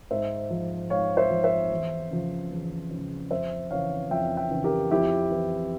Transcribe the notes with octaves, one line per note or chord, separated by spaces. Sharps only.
G#2 C5 E5
F3
G#2 C#5 F5
C5 E5
F3
C5 E5
E2
C#3 F3
E2
C#3 F3
F2 C5 E5
C#3 E3 C#5 F5
F2 E5 G5
E5 G5
C#3 E3
G4 A#4
F2 E4 G4
E3